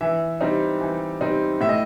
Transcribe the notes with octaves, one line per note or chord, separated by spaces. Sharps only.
E3 E5
G3 C4 D#4
E3
G3 C4 D#4
A2 E5
D#5